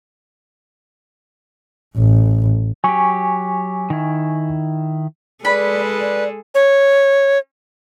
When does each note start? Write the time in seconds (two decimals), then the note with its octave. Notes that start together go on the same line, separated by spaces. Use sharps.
1.97 A1
2.84 F#3 G4 G#5 C#6
3.90 D#3 E4
5.45 G#3 G#4 A4 B4 D5 B5
6.00 D5
6.55 C#5